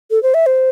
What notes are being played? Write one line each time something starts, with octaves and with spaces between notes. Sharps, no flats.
A4
C5
E5
C5